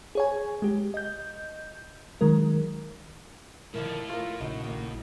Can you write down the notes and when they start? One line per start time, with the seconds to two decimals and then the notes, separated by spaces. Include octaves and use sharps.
0.15 G#4 C#5 G#5
0.62 G#3 G4
0.94 D#5 G6
2.21 D#3 F#3 G#3 A#4
3.74 A2 D3 D#3 F3 A#4
4.09 A3 F4 A#4
4.40 A#1 C#3 D#4 F#4 D#5
4.64 D#3 A#3